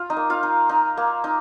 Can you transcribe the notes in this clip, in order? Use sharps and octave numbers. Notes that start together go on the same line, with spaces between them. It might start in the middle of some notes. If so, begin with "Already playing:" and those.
Already playing: F4
D#4 D#5
A#3
F4 F5
D#4
D#4
A#3
D#4